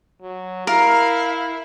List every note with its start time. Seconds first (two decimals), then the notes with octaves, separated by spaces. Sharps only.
0.22 F#3
0.67 E4 A#4 F5